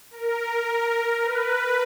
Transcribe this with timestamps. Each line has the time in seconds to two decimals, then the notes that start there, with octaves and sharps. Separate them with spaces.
0.11 A#4
1.21 B4